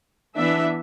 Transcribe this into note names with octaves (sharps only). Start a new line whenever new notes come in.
E3 B3 D4 E5